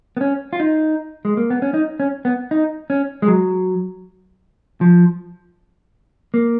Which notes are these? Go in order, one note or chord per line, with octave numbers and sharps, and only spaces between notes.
B3
C#4
F4
D#4
G#3
A#3
B3
C#4
D#4
C#4
B3
D#4
C#4
G#3
F#3
F3
A#3